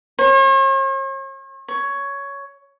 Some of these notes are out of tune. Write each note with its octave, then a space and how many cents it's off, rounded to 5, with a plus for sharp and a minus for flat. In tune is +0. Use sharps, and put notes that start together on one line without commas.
C#5 -45
C#5 +10